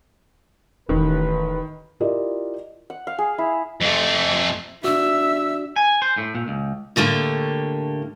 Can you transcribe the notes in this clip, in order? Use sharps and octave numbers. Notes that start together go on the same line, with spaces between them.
E1 A1 D#3 B4
E4 F4 G4 A#4 D5 D#5
F#5
F5
G#4
E4
F2 A3
D4 F#4 D5 E5 E6
G#5
C5
A2
A#2
C#2
A2 D3 A3 A#3 G4